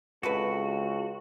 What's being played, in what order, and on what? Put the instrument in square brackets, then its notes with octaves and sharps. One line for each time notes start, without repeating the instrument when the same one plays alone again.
[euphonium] C#2 [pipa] C3 A4 B4 [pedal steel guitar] F#4